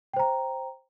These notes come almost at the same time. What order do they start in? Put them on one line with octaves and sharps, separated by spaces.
G5 C5 A#5